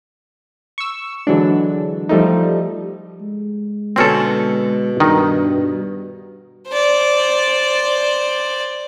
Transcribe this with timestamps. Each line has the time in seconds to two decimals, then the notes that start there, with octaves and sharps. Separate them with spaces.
0.78 C#6 E6
1.27 D3 E3 F#3 G#3 D4
2.09 F3 G3 A3 D#4
3.21 G#3
3.96 B2 D3 C4 C#4 A4
5.00 G2 D#3 D#4
6.68 C5 D5